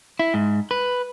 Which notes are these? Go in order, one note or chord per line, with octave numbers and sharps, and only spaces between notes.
E4
G#2
B4